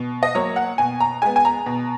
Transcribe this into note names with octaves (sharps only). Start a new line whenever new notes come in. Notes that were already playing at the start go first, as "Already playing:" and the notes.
Already playing: B2
D#5
F#3 A#3 C#5
F#5
B2 G#5
A#5
G#3 B3 G#5
G#5
A#5
B2